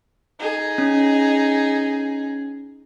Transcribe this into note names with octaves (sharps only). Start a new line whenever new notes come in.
D#4 G#4
C#4